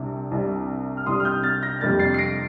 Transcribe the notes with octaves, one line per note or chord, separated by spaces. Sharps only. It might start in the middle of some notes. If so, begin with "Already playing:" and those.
Already playing: C2 C3 G3 D4
C2 C3 G3 D4
F6
C2 C3 G3 D4 C6 D#6
F6
D#6 G6
F6 A6
G6 A#6
F2 C3 G3 A#3 D4 F6 A6
A6 C7
C7
A#6 D7